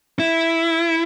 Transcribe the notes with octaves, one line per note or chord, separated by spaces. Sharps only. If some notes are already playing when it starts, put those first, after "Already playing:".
E4